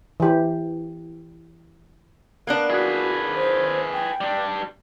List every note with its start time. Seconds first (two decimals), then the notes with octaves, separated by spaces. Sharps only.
0.20 E3 G4
2.47 A#3 B3 D4 F#6
2.71 F#4 G#4 B4
3.35 C5
3.93 G5
4.21 G3 D4